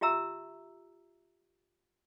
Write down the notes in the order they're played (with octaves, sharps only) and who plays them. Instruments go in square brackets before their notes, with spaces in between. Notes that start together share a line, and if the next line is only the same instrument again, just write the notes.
[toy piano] F4 G4 E5 A#5 E6